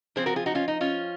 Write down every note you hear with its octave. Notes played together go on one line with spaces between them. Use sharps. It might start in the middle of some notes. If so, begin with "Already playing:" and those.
F3 C4 G#4 C5
F#4 A#4
F4 G#4
D#4 F#4
C#4 F4
D#4
C#4 F4